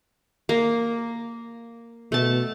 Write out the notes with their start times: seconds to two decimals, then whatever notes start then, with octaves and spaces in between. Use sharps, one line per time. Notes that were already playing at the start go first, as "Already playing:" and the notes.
0.49 A#3
2.12 B2 A3 A5